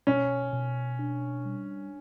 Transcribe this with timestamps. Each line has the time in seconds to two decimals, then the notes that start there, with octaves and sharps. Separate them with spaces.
0.07 B2 C#4
0.53 B2
0.99 D4
1.46 G3